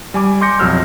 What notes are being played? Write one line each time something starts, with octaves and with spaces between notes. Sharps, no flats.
G3 G#5 D6
C6 D6 G6 A#6 C#7
B1 F2 F#3 E6 F6